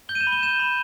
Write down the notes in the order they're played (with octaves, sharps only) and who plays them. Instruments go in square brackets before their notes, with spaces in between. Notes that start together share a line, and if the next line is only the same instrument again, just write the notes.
[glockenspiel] G6 G7
D#7
E7
B5
G7
G6 E7
B5